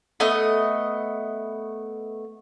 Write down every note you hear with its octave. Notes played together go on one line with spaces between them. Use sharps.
A3 B3 D#5